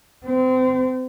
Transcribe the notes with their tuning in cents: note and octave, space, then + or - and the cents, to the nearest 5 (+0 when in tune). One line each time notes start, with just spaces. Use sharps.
C4 -30